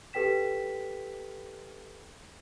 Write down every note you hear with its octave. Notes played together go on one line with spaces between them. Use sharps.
G4 A4 B4 G5 B6 E7